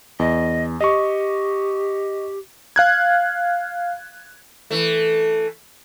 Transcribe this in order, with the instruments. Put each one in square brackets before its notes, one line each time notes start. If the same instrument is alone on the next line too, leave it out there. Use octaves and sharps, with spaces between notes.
[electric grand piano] E2 [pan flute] D#5
[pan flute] G4 [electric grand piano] D#5 C#6
[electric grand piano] F5 F#6 G#6
[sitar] E3 A3